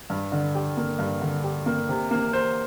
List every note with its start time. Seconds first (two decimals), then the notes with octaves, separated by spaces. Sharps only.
0.10 G2
0.32 D3
0.55 G4
0.77 A#3
0.99 G2
1.22 D3
1.44 G4
1.66 A#3
1.89 C3
2.11 A#3
2.33 C5